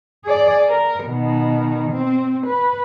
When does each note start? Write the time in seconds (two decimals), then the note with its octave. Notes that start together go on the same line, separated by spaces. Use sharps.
0.25 G#4 D5
0.69 A#4
1.05 B2 D#3
1.91 C4
2.47 B4